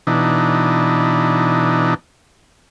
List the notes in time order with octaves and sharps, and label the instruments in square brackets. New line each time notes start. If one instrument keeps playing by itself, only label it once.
[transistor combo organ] B2 E3 D4 D#4